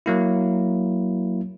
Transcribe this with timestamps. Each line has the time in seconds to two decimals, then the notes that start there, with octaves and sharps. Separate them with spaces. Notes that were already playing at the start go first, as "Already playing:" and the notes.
0.06 F#3 A#3 E4